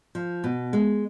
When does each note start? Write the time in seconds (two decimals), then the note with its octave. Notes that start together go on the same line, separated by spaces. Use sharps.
0.15 F3
0.44 B2
0.73 G#3